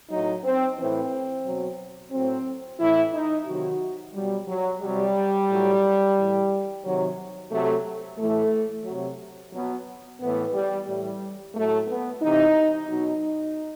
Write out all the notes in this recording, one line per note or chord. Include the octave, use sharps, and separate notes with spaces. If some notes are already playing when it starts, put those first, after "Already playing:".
A2 F#3 D#4
C4
A2 E3 C4
B2 F#3
A2 F#3 C4
A2 E3 E4
D#4
C3 D#3 F#3 F#4
B2 F#3 G3
F#3
C3 F#3 G3
A2 F#3
A2 E3
C3 D#3 F#3
C3 F#3 A3
A2 E3 A3
C3 F#3
B2 F#3
A2 E3 B3
G3
A2 E3 G3
A2 F#3 A3
B3
C3 E3 D#4
B2 F#3 D#4